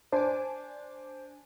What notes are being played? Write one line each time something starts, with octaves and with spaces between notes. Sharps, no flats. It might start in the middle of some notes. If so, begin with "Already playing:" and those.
D4 C5 G#5 D6